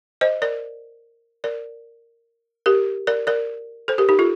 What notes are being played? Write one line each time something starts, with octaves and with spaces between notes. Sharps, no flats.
C5 D#5
A#4 D5
A#4 D5
G4 A#4
A#4 D5
A#4 D5
A4 C5
G4 A#4
D#4 G4
F4 A4